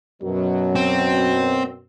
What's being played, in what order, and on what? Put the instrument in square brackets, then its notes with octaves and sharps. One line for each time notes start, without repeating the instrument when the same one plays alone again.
[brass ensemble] F#2 B2 F#3
[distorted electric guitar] C4